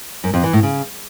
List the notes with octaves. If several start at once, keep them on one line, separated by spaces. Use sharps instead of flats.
F#2
F2
E3
A2
C#3